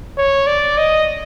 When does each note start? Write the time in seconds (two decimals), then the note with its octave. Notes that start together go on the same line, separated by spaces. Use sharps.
0.18 C#5
0.47 D5
0.78 D#5